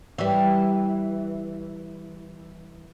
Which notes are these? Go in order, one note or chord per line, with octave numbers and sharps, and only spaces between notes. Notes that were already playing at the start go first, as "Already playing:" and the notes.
E3 G3